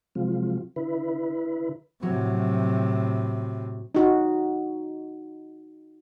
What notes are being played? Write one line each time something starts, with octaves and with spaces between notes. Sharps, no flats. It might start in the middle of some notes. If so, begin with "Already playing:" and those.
C3 F3 F#3 G#3 C4 F4
D3 E4 B4
A2 C3 F#3
D#4 F#4